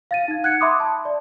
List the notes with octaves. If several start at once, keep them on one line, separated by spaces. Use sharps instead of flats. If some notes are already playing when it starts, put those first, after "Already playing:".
F5 A6 D#7
D#4 G#6
F#5 F#6 G#6 C#7
E5 B5 C6 D6 D#6
A5
D5